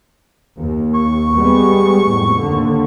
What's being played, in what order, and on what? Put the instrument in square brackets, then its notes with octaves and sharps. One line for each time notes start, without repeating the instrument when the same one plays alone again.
[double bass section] D#2
[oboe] C#6
[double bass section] G3 G#3 B3
F2 A2
D#2 D3